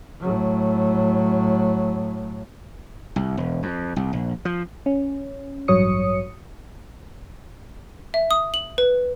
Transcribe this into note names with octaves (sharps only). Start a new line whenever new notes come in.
A2 F#3
C2
E1
F2
C2
A#1
F3
C#4
A1 G2 F#3 C#5 D#6 C#7
E5
D#6
F#7
B4